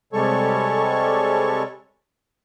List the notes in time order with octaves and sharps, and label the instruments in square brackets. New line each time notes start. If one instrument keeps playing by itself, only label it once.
[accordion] C3 G3 G#3 A4 C#5 C#6